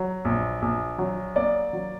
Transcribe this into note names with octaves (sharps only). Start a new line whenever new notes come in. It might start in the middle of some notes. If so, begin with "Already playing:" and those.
Already playing: F#3
A#1
A#1
F#3
A#3 D5
F#3